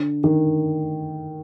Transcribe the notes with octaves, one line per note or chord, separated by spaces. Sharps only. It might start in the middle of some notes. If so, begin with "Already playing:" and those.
Already playing: D3
D#3